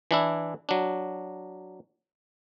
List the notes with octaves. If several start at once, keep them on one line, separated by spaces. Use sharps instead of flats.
E3 D4 E4
F#3 D4